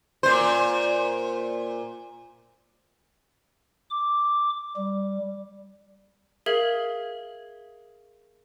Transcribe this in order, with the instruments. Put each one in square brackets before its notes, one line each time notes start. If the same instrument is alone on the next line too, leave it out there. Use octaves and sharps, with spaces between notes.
[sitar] A#2 C5
[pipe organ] D6
G3
[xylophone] G#4 A#4 E5 F5 G#6 F#7